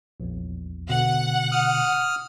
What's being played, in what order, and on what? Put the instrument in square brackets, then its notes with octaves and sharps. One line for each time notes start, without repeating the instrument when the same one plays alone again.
[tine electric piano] A#1 E2
[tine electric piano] B2 D3 [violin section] F#5
[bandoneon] D#6 F6